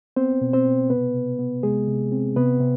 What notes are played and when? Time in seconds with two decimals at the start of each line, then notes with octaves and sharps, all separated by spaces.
0.16 B3 C4 C5
0.41 B2
0.53 C4 C5
0.66 B2
0.90 C3 B3 B4
1.14 C3
1.39 B3
1.63 C3 G#3 G#4
1.88 C3
2.12 C4
2.36 C3 B3 B4
2.60 C3